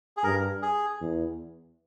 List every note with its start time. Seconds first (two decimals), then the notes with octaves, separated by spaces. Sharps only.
0.17 G#4
0.24 G2 A#4
0.62 G#4
1.01 E2